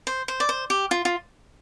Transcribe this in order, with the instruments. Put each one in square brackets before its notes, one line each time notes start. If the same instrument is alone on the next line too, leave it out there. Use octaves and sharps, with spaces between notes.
[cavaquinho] C5
C5
D5
C5
G4
F4
F4